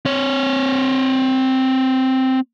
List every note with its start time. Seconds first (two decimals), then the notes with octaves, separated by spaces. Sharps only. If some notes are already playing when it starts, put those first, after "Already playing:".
0.05 C4 C#5